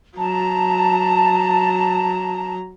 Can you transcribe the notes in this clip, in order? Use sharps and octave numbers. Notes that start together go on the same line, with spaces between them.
F#3 A5 A#5